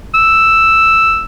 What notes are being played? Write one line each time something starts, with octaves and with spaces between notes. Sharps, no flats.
E6